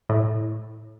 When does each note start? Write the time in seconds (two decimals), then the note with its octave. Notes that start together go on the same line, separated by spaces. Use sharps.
0.09 A2